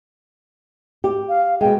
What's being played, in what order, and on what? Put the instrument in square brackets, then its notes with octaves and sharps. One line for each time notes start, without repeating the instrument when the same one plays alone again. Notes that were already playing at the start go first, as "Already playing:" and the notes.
[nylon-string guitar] G4
[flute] F5
[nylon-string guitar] B2 G#3 [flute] G5